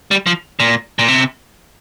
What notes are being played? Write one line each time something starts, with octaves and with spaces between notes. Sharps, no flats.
G3
F3
A#2
A#2
C3